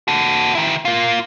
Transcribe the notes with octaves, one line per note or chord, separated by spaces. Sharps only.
F#4 A4
D#3 E4
A#3 F4